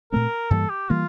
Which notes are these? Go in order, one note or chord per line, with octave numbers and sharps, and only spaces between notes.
A#2 A3 C4 A#4
G2 E3 G3 A#3 A4
G4
E3 G3 A#3 F4